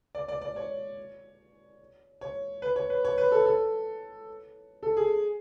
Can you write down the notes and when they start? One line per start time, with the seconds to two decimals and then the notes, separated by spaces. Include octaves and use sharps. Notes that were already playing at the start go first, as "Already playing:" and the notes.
0.15 D5
0.28 D5
0.41 D5
0.56 C#5
2.21 C#5
2.62 B4
2.76 C#5
2.90 B4
3.04 C#5
3.18 B4
3.32 A4
3.46 A4
4.83 A4
4.97 G#4